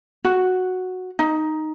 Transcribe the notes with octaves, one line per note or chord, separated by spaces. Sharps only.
F#4
D#4